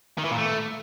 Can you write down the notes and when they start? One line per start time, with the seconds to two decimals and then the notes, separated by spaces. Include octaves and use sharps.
0.18 D#3
0.25 E3
0.31 A#2
0.38 A3